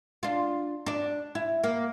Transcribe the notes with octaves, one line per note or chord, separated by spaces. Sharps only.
D4 F4
D4 D5
E4
A#3